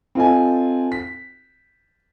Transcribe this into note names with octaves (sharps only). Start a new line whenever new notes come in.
C4 F4 A4 D#5 G#5
B6